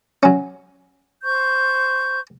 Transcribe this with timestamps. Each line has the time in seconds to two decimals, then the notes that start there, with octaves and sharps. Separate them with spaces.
0.23 F#3 C#4
1.24 C5 C#6 G6